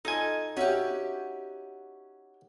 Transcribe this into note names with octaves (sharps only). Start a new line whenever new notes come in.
D#4 F4 A4 D#5 G#5
C#4 F#4 G4 E5 F#5